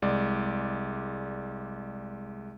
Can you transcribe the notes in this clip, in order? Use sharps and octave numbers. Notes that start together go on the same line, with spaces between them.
C2 G#3 D5